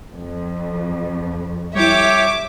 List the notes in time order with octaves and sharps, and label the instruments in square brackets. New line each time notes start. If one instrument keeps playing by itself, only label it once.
[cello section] F2
[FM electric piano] G3 E4 [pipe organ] G4 C#5 [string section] E5 D6